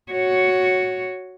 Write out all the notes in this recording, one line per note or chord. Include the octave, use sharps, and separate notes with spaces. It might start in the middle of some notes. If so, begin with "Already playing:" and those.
F#4 C#5